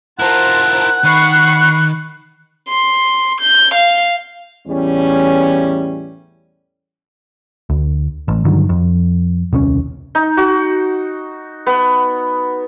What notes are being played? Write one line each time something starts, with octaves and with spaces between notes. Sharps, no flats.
E4 F4 A#4 C5 F#5 A5
D#3 B5 C#6 F#6 C7
C6
G6
F5
E2 A2 G3 C#4
D2
A1
G2 D3 D#3 F#3
F2
D#1 C2 C#4
D#4
F#4
B3